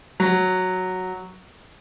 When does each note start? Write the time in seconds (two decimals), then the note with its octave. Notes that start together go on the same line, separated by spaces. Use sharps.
0.20 F#3